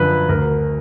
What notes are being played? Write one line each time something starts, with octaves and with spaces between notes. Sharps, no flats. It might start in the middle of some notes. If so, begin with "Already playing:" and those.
Already playing: F#2 D3 F3 B4
D2 A#4